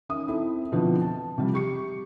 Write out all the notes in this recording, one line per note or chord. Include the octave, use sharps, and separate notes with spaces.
D#3 C#4 E5 D#6
C4 E4 A4
B2 D3 F3 C4 D4 E4
A5
C3 F3 G3
G4 C#6 C#7